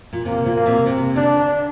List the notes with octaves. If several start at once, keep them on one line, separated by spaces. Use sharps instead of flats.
A#2
C3 A#3
A#2
A#3
C3
C3
D3 D4